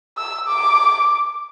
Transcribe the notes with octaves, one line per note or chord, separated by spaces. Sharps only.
E6
D6